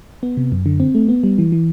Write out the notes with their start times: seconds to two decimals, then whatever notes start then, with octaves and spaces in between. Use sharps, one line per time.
0.23 B3
0.37 C3
0.52 F#2
0.66 D3
0.80 C4
0.95 A3
1.09 B3
1.24 G3
1.38 E3
1.52 E3